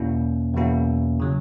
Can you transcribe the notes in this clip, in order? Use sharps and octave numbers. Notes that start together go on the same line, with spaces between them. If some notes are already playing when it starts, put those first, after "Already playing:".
Already playing: E2 B2 A#3 C#4 E4
E2 B2 A#3 C#4 E4
C#3 F#3